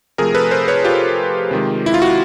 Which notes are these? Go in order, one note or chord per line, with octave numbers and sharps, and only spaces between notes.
C3 F3 A3 G#4 A#4
A4 B4
A#4 C5
B4 C#5
F4 G4
C3 D#3 G#3
E4
F4
F#4